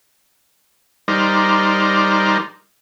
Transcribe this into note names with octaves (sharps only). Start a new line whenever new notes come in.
G3 D#4 A#4 C5 D5